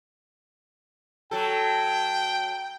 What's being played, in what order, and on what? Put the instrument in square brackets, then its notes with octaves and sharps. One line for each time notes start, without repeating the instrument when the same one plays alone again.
[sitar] F#3 A4 [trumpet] G5